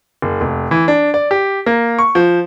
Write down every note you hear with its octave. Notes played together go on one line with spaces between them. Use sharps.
F#1
F1
E3
D4
D5
G4
A#3
C#6
F3